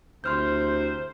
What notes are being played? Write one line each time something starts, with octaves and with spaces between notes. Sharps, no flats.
D2 C3 E4 C5 C6 F6 G6